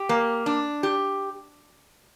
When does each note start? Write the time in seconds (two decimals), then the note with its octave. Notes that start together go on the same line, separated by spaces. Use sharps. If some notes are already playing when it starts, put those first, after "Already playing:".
Already playing: G4
0.09 A#3
0.46 D4
0.83 G4